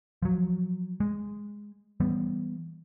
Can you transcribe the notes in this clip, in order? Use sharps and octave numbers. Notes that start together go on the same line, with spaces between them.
F3 F#3
G#3
E3 G3 B3